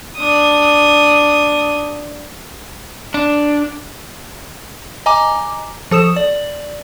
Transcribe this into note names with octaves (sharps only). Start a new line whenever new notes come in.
D4 D#6
D4
D#5 G#5 A#5 D6
F3 A4 D#6 E7
D5